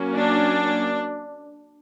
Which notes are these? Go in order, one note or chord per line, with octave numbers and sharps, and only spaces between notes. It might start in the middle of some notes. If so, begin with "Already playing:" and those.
Already playing: F#3 A#3 C#4
D4